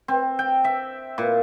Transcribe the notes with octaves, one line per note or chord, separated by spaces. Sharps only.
C4
G5
E5
A#2